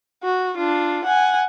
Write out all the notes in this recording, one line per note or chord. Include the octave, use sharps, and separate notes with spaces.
F#4
D4 F4
F#5 G#5